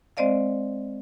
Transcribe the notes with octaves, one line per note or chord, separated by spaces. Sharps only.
G#3 C4 C5 D5 D#5 F5